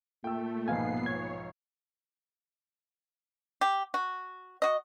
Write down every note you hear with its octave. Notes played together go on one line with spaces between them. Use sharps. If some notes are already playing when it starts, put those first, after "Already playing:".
A#2 A3 G5 E6
B1 G#2 F3 B3 F5 G#5 C7
C#5 G#6
G4
F#4
F#4 D#5